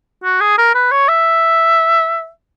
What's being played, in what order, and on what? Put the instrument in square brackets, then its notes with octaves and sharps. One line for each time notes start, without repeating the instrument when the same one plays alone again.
[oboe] F#4
G#4
A#4
B4
C#5
E5